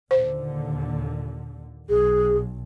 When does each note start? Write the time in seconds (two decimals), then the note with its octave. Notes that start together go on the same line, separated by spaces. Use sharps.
0.11 D#2 A#2 D3 C5
1.89 B1 G#4